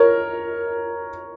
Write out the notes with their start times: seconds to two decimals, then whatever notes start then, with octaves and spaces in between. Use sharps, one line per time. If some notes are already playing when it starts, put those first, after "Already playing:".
Already playing: A#4 C#5